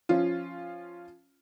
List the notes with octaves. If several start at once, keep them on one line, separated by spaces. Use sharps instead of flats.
F3 C#4 F4